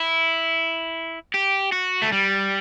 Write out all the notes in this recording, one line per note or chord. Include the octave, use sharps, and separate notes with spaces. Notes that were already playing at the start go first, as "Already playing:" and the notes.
Already playing: E4
G4
F#4
A3
G3